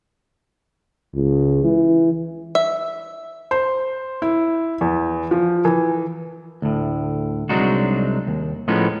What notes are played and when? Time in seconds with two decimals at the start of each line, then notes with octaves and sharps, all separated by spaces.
1.15 C#2
1.63 E3
2.55 E5
3.51 C5
4.22 E4
4.81 E2
5.31 F3
5.65 E3
6.62 D2 A2
7.49 C2 F#3 G#3 D4 D#4 F#4
8.27 D#2
8.68 A2 F3 G#3 B3 C#4 D#4